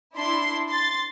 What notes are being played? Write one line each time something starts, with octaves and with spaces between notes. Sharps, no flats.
D4 E4 C6
C6 A6